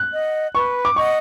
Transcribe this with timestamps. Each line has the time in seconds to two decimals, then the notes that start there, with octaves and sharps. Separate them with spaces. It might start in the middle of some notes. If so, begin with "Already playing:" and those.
Already playing: F#6
0.12 D#5 F#5
0.54 B4 C#6
0.85 D6
0.96 D#5 F#5 C#6